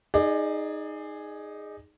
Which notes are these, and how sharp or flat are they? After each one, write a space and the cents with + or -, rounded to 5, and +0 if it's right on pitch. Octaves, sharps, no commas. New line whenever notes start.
D#4 +0 G#4 +0 D5 +25